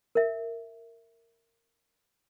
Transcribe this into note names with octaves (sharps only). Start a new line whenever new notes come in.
A#4 E5